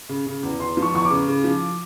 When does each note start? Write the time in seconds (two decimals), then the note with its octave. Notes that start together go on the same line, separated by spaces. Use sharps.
0.09 C#3
0.26 C#3
0.43 E2
0.60 E2 C6
0.77 F3
0.82 C#6
0.94 E2 C#6
1.05 D6
1.10 C#3
1.28 C#3
1.44 F3